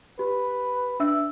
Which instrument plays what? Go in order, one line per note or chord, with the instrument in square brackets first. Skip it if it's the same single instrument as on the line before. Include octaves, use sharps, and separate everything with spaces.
[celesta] G4 [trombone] B4
[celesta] D4 E5 E6